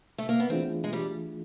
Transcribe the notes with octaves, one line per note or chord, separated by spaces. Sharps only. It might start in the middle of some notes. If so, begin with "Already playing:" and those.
A3
A#3
B3
E3 A3 C4 D4 F4 G#4
G#3
G3